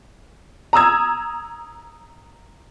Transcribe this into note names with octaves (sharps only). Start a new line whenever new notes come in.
A#5 D#6 E6 G#6